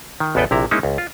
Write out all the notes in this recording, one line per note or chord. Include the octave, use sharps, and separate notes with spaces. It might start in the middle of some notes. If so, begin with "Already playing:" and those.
D#3
A1 E2 B3 A4 B4 G5
A#1 C3 E4 A#5
G#3 A#3 C#4 D#4 E4
C#2
F4